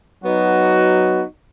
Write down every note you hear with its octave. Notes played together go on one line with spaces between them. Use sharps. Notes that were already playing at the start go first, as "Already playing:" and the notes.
F#3 B3 D#4 F#4